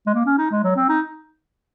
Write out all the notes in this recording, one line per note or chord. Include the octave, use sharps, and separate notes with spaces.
G#3
A#3
C#4
D#4
G#3
F#3
C4
D#4